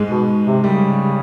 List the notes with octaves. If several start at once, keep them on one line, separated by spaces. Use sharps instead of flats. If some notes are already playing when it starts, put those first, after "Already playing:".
Already playing: G#2 G#3
B2
C3
C#3 G3